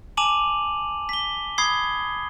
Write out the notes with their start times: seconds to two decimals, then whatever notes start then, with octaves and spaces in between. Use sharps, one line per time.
0.17 G#5 A5 D6 D#7 F7 F#7
1.09 B6 G7
1.58 B5 D#6 G#6 C7 G7